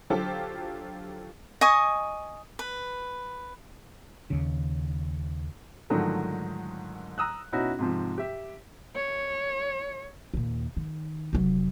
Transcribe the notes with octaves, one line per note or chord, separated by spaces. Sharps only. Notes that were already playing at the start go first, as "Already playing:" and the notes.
D3 F#3 F4 G4 A4 C5
D#5 G#5 C#6 D#6
B4
D#2 C#3
G#2 D3 D#3 F3 F#3 A3
A#5 D#6 E6 F#6
B2 C#4 D#4 E4 F#4
G#2 C3 F3
G4 E5
C#5
D#2 A#2
D#3
F1 F#3